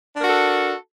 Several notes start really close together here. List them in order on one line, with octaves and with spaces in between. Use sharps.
D4 A#4 F#4 A4